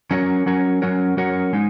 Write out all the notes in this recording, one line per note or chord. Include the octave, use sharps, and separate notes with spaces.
F#3 C#4 F#4 A#4 C#5
F#3 C#4 F#4 A#4 C#5
F#3 C#4 F#4 A#4 C#5
F#3 C#4 F#4 A#4 C#5
G#3 D#4